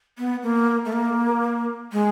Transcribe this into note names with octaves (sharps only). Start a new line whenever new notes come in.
B3
A#3
A3
A#3
G#3